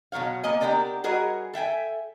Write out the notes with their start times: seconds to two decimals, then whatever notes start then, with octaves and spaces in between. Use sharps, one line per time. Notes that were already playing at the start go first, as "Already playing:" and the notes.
0.12 B2 F3 F#3 C#5 F5
0.43 A#3 B3 D#5 G#5
0.60 B3 D4 G4 A#4 D5 D#5
1.04 G3 F#4 G#4 A#4 C#5 D#5
1.53 A4 E5 G5 G#5